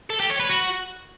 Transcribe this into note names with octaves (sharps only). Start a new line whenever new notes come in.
A4
G4
C#5
B4
F#4